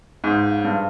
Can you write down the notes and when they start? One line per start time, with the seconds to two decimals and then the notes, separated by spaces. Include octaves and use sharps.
0.24 G#2 C#3 F3 G#3
0.65 G2